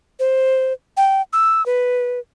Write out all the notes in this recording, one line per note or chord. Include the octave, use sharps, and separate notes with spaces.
C5
G5
E6
B4